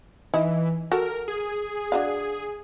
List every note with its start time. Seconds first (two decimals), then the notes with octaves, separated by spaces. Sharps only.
0.34 E3 D#4 E4
0.92 F#4 A4 A#4
1.28 G#4
1.92 D4 F#4 F5